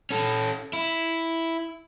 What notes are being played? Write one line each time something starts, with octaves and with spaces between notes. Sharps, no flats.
C#4 A4
E4